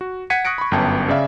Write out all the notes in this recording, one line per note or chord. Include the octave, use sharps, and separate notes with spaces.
F#4
F#5 G#6 B6 C#7 D#7
C#6 D#6 F#6 A#6 C#7 D7
B5 C#6
G1 F#2 B3 G5 A5
C#3 D5 E5 F5